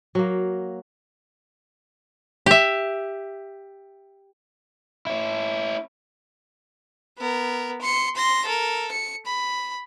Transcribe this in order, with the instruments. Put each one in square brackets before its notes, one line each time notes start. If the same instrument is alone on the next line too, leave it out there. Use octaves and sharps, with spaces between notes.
[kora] F#3 A#3
[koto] G4 E5
[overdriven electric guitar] C#4 E4
[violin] B3 A#4
C6 C#7
C6 A#6
A4 A#4
C#7
B5